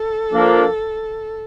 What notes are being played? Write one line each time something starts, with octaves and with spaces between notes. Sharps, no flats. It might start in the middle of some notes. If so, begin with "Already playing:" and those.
Already playing: A4
F3 A#3 D4